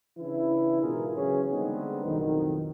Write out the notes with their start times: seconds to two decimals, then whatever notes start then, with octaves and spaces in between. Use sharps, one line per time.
0.18 C#3 E3 D4 E4
0.80 G#2 B2 F4 G#4 A#4
1.15 C#3 E3 F#3 C#4 G#4
1.51 D3 G3 G#3 B3 C4 D#4
2.06 B1 F2 A2 D#3